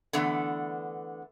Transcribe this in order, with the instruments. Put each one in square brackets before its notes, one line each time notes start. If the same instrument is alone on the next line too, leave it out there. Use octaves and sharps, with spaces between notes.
[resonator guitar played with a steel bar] D3 E3 A3 B3